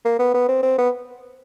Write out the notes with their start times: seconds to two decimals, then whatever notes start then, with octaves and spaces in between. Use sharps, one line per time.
0.05 A#3
0.19 B3
0.34 B3
0.48 C4
0.63 C4
0.78 B3